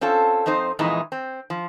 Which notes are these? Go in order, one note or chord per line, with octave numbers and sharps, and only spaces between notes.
C4 C#4 F4 A4
F2 C4 D#4 C5
F2 A#2 E3 G#3 D#4
C4
F3